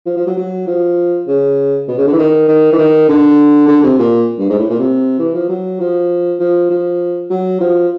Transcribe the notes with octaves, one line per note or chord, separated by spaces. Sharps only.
F3
F3
F#3
F#3
F3
C#3
B2
C#3
D3
E3
D#3
D#3
E3
D#3
D3
D3
C3
A#2
G2
G#2
A2
A#2
C3
E3
F3
F#3
F3
F3
F3
F#3
F3